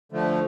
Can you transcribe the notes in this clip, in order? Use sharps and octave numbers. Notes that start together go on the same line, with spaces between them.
D3 F3 A3